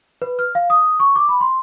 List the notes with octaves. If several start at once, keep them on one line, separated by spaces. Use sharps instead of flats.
B4
F6
F5
D#6
C#6
D6
B5
C6